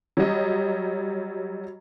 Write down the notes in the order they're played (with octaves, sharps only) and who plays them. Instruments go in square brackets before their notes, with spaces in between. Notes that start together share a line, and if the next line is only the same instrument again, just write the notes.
[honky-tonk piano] F#3 G3 D#5